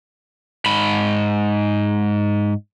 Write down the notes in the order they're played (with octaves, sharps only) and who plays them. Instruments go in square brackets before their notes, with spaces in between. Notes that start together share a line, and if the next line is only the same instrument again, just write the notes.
[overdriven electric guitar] G#2 B5